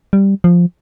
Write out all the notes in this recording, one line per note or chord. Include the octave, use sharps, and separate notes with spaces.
G3
F3